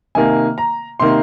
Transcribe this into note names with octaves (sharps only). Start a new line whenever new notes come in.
C3 D#3 A#3 G#5
A#5
C3 D#3 A#3 C6